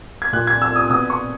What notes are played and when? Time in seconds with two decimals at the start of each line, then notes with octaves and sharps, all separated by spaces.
0.22 G#6
0.33 A#2 F#6
0.47 G#6
0.62 E6
0.76 D#6
0.90 B2 D#6
1.10 C#6